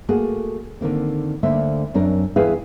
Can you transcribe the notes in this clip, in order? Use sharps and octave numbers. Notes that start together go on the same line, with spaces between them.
A3 A#3 F#4 G#4
D3 D#3 A#3 C4
D2 D3 A#3 C5 E5
F#2 C4 D4 A#4
E2 E4 G#4 B4 F5 G5